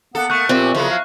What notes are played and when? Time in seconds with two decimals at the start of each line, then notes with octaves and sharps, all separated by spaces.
0.15 A#3 B3 A4 F#5
0.30 A3 C#6 F#6
0.49 A#2 F3 C4 G4 E5
0.75 C2 C#3 F3 F#3 E4 F4
0.90 F5